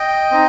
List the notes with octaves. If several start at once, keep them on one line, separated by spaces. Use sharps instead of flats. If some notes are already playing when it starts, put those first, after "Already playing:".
Already playing: D#5 G5
C4 D#4